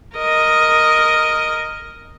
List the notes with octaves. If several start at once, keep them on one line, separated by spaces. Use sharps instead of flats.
A#4 D#5